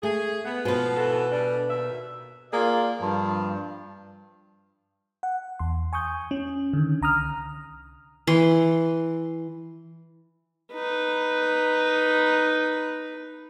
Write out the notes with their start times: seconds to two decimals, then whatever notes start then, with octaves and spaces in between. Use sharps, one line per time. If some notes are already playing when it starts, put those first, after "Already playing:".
0.03 A3 G#4
0.46 B3
0.65 B2 F3 B3 B4
0.97 E3 F#4 A4
1.32 G3 D4
1.70 D#2 E5
2.53 A#3 F4 G#4 D5
3.00 G2 F3
5.23 F#5
5.59 E2 C6
5.93 G#5 C#6 D#6 G6
6.31 C#4
6.73 D3 D#3
7.01 C2 A#5 D#6 F6
8.27 E3 C6
10.73 D#4 B4